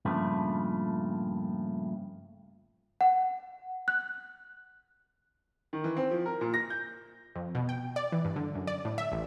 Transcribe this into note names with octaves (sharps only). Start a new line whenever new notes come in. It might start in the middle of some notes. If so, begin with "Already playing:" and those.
G2 A#2 C#3 F3 A3
F#5
F#6
D#3
E3
C4
F3
A#4
A#2
A#6
G6
F2
B2
G5
D5
E3
G2
D3
F#2
D5
A2
E5
A1